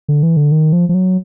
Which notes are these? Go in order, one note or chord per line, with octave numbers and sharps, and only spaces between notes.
D3
E3
D3
D#3
F3
F3
F#3